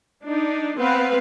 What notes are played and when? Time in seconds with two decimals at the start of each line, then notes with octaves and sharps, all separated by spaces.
0.25 D4 D#4
0.78 B3 C4 B4 F5